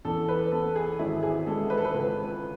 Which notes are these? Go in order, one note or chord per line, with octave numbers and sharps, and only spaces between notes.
E2 A4
B4
B3 A4
G#4
G#1 E4
G#4
G#3 A4
B4
A4
B4
C#2